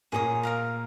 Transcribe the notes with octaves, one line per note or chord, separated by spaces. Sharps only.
A#2 A#3 G#4 C#5 A#5 D#6
A#4 F5 A#5